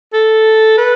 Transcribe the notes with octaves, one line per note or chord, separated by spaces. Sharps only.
A4
B4